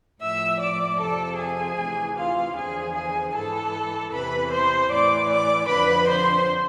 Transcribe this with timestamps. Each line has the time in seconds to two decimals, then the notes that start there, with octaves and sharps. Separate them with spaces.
0.22 A2 F3 E5 E6
0.61 D5 D6
0.99 F2 C3 F3 A4 A5
1.39 G#4 G#5
1.78 D2 C3 E3
2.17 F4 F5
2.56 E2 D3 F3 G#4 G#5
2.95 G#4 G#5
3.35 G#2 E3 A4 A5
4.12 E2 C3 E3 B4 B5
4.51 C5 C6
4.90 A2 E3 D5 D6
5.29 D5 D6
5.68 F2 D3 F3 B4 B5
6.08 C5 C6